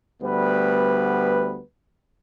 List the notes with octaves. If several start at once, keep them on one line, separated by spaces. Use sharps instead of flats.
D2 G3 B3 B4